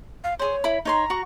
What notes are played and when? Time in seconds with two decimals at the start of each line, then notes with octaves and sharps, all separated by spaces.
0.24 F5
0.39 G#4 C5 C#5
0.64 E4 B5
0.85 D#4 C#5 A#5 C6
1.10 F#4 C#6